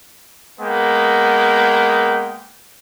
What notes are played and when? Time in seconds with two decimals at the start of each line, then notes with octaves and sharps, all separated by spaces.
0.60 G#3 A#3 B3 G5